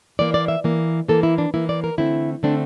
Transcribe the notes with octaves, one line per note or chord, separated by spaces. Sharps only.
E3 A#3 D5
D5
E5
E3 A#3
E3 A#3 A4
E4
D4
E3 A#3 E4
D5
A#4
D3 A3 C4 E4
D3 A3 C4 D4